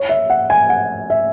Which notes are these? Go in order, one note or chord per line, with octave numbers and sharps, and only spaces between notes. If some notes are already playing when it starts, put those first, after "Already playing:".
Already playing: C#5
E5
F#5
G#5
F#5
E5